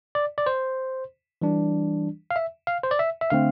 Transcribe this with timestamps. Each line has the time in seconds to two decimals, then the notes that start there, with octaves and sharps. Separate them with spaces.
0.15 D5
0.38 D5
0.46 C5
1.42 E3 G3 D4
2.31 F5
2.36 E5
2.67 F5
2.83 C5
2.91 D5
2.99 E5
3.21 E5
3.30 D3 A3 C4 F5